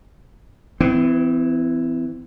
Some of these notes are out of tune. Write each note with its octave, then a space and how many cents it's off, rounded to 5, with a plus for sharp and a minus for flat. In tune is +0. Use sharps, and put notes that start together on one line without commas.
E3 +5 C4 -40